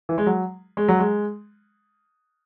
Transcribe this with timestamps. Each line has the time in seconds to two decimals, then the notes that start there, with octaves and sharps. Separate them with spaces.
0.09 E3
0.18 G#3
0.26 F#3
0.77 G#3
0.88 F#3
0.99 G#3